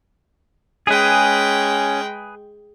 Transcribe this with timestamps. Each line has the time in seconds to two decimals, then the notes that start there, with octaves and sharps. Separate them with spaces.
0.87 G#3 C#4 G#4 B4 G5